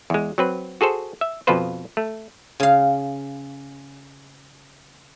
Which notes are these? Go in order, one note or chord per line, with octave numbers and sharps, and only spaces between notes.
E2 G#3
F#3 C4 B4
F#4 G#4 A4 C5
E5
F2 B2 F3 F4 B4 C5
A3
C#3 F5